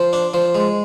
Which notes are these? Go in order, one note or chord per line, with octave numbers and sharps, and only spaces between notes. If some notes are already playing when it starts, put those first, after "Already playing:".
Already playing: F3
D4
F3
G#3